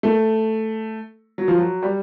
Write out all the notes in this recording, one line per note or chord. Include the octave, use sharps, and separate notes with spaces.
A3
F#3
F3
F#3
G3